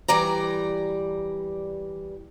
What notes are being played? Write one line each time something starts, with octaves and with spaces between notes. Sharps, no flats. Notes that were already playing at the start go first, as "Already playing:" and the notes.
E3 G3 D5 A#5